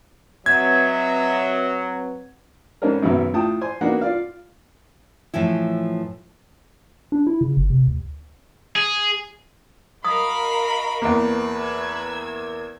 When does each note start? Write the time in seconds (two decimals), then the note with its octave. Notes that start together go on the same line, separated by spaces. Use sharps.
0.46 F#3 C4 B4 D#5 E5 F#5 G#6
2.82 G#2 G3 C4 C#4 A4 A#4
3.02 G#1 F#2 B2 B3 E5
3.33 A2 F4 G5 A5 D#6
3.61 C5 G#5 C6
3.81 A#3 B3 D4 D#4 F#4 F#5
4.01 F4 D5 F5
5.34 A2 E3 F3 E4
7.12 D4
7.27 E4
7.41 C#3
7.57 G1
7.70 C3
7.88 D2
8.76 G#4
10.05 F#4 A#4 D#5 F5 B5 D#6
11.02 E2 A3 A#3 B4
11.55 E6 G#6